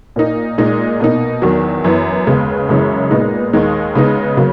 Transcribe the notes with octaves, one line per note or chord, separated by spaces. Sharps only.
A#2 A#3 D#4
A#2 G#3 D#4
B2 A#3 D#4
E2 D#3 F#3
F#2 E3 B3
D#2 C#3 G#3 B3
F#2 C#3 E3 G#3 C#4
A#2 G#3 B3 D#4
D#2 D#3 G#3 D#4
C#3 G#3 B3 D#4
C#3 F#3 A#3